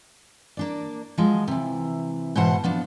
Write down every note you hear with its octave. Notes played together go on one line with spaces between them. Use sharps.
A#3 D4 D5
F3 F#3 G#3
C3 E3
G#2 B2 E3 C5 F#5 A5
F3 B3 D4